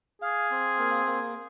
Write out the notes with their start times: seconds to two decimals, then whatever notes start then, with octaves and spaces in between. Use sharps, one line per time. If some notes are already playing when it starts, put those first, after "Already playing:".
0.22 G#4 F5
0.51 C4
0.78 A#3
1.06 A#3